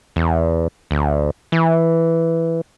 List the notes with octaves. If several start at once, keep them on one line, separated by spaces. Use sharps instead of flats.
E2
D2
E3